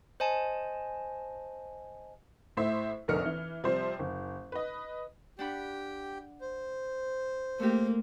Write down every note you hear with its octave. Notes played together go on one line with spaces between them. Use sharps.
C5 D#5 G#5 A5
A2 E4 C5 E5
F1 A#1 A#4 D#5 F6 C#7
E3
C3 F3 G3 C5
F#1
B4 D#5
D4 G4 F#5 G5 B5
C5
A3 A#3 C4 G4